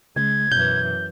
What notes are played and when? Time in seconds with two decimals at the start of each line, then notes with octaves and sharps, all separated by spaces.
0.16 C#3 G#3 G#6
0.52 F#2 B2 E3 G6